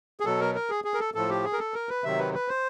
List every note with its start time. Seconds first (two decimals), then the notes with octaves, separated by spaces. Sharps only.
0.20 G#4
0.25 B2 F#3 A4
0.40 A#4
0.55 A#4
0.70 G#4
0.84 G#4
0.94 A#4
1.00 A4
1.14 A2 F3 A4
1.29 G4
1.44 G#4
1.53 A#4
1.59 A4
1.74 A#4
1.89 B4
2.04 C3 D#3 F#3 E5
2.19 B4
2.34 B4
2.48 C5